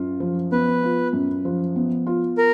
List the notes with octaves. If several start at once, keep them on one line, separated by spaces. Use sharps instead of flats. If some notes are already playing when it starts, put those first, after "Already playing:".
Already playing: F#2 F4
F3
B3 B4
F4
F#2
F3
B3
F4
A#4